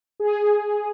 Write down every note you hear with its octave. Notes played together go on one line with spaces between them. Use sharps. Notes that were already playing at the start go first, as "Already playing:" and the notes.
G#4